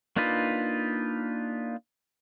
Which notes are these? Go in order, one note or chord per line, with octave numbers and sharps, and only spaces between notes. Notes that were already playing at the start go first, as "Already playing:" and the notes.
A#3 D4 D#4 F4 B4